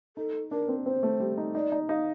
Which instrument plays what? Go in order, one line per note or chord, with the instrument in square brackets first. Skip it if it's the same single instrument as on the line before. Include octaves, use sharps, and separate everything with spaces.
[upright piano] D#4 [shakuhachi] A4
[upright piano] D4 [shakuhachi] A#4
[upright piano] C4
[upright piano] C4 [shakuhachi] C5
[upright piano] A3
G3
D#4
[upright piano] D#4 [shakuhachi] D5
[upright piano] D#4
[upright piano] D#4 [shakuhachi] F5